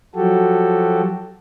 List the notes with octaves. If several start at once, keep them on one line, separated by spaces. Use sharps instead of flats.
F3 F#3 F#4 G4 A4